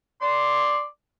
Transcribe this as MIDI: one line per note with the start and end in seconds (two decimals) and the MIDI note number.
0.21 0.84 74
0.21 0.84 84